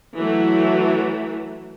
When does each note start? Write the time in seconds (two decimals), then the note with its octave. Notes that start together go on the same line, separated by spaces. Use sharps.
0.18 E3 F#3 A3